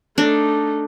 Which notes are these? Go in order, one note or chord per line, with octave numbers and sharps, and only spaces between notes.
A3 D4 D#4